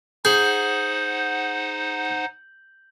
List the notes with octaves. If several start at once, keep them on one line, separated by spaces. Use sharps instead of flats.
D#4 G#4 C5 F#5 G6 F#7